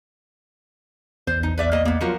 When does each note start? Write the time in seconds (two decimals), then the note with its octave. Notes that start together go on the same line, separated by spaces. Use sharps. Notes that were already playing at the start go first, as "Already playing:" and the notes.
1.27 A#1 E2 C5
1.43 D#4
1.58 B4 D5 E5
1.72 A#3 D#5
1.85 A#3 B3
2.01 F3 F#3 F4 F#4 A#4 C#7